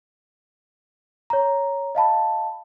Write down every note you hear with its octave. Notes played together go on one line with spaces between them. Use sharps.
C#5 A#5
D#5 F5 A5 B5